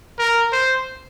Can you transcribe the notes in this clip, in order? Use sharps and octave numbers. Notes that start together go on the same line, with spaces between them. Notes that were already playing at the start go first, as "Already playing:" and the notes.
A#4
C5